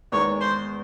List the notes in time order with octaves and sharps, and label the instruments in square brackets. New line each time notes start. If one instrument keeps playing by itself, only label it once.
[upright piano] E2 D#3 G#3 D#4 [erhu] C#5
[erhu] C5